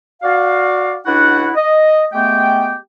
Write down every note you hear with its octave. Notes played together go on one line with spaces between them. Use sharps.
F#4 D5 F5
C#2 D4 E4 F#4 F#5
D#5
G#3 A3 B3 G4 G5